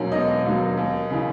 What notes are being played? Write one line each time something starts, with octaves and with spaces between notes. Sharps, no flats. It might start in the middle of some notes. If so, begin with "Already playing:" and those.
Already playing: E1 D#2 D#3 F#3 C#4
E1 D#4 D#5
D#2 D#3 F#3
D#2
C#3 E3